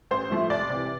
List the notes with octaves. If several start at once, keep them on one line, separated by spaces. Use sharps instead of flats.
A1 C5
A2 F3 A3
C2 D5
C3 E3